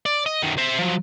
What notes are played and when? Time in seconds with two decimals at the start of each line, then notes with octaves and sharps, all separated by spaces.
0.06 D5
0.26 D#5
0.42 F#2 D#3
0.58 C5 E5
0.79 F3 F#3